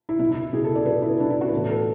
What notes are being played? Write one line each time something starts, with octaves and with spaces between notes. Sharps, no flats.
E4
B2 E4
E4
E4
B2 G#4
A4
D5
B2 B4
E4
B2 D4
E4
F#4
B4
A2 E3 A4
A4